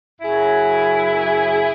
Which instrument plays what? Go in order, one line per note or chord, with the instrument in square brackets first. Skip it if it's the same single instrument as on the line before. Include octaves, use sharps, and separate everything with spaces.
[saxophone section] F#2 C#3 F#3 E4 G#4